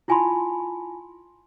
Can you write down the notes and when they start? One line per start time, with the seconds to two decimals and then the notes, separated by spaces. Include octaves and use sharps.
0.08 E4 F4 G#5 A5 B5 C6